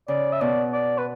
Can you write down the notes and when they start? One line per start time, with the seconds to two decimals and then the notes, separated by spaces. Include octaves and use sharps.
0.08 C#3 D5
0.32 E5
0.40 B2 D5
0.73 D5
0.98 B4